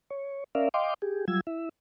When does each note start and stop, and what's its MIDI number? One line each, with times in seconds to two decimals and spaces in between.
0.10 0.44 73
0.55 0.69 61
0.55 0.69 70
0.55 0.69 74
0.55 0.69 76
0.55 0.69 77
0.74 0.94 75
0.74 0.94 77
0.74 0.94 79
0.74 0.94 84
0.74 0.94 86
1.02 1.25 67
1.02 1.25 68
1.28 1.40 54
1.28 1.40 55
1.28 1.40 65
1.28 1.40 88
1.28 1.40 92
1.47 1.69 64
1.47 1.69 76